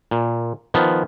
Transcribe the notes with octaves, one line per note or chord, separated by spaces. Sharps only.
A#2
D#3 F3 B3